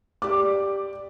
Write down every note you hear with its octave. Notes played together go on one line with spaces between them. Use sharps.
G4 D5 D6